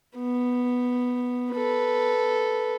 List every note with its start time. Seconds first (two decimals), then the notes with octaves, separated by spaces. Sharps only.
0.17 B3
1.53 A4 B4